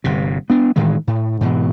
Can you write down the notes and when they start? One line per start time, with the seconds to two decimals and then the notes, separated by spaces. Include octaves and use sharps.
0.04 G1 C3
0.50 B3 D4
0.76 A2 D#3 E3 G#3
1.07 A2
1.41 G#2 B2 E3